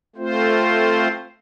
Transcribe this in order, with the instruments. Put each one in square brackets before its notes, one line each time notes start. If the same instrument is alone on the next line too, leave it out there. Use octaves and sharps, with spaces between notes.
[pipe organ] A3 C4 F4 C5